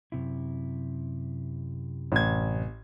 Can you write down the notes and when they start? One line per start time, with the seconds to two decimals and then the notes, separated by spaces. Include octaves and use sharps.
0.12 F#2 C3 E4
2.12 A1 G#6